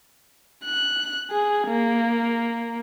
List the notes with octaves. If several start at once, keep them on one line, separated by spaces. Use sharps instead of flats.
F#6
G#4
A#3